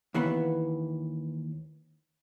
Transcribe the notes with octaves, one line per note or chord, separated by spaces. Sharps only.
D#2 E3 B3